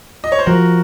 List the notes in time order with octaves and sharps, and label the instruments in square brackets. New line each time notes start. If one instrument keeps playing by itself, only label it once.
[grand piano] D#5
C#5
C5
[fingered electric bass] F3 [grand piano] F#4 A#4